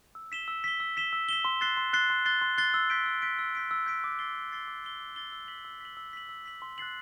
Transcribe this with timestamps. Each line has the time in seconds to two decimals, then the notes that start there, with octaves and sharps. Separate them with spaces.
0.15 E6
0.32 B6 E7 G7
0.48 E6
0.64 B6 E7 G7
0.80 E6
0.97 B6 E7 G7
1.13 E6
1.29 B6 E7 G7
1.45 C6
1.61 F#6 A6 C7 G7
1.77 C6
1.93 F#6 A6 C7 G7
2.10 C6
2.25 F#6 A6 C7 G7
2.42 C6
2.58 F#6 A6 C7 G7
2.74 E6
2.90 G6 B6 D7
3.06 E6
3.22 G6 B6 D7
3.39 E6
3.55 G6 B6 D7
3.71 E6
3.86 G6 B6 D7
4.04 D6
4.19 A6 C7 G7
4.35 D6
4.52 A6 C7 G7
4.68 D6
4.84 A6 C7 G7
5.01 D6
5.16 A6 C7 G7
5.33 E6
5.48 B6 F#7
5.65 E6
5.81 B6 F#7
5.97 E6
6.13 B6 F#7
6.29 E6
6.46 B6 F#7
6.62 C6
6.78 F#6 A6 C7 F#7